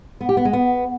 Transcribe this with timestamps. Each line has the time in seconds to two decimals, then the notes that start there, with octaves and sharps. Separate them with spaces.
0.21 B3
0.29 G4
0.37 B3
0.45 G#3
0.53 B3